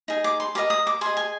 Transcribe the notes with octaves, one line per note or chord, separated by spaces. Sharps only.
D#4 G#4
D6
C6
G4 A#4 D#5 D6
D#6
D6
G#4 D#5 C6
G#5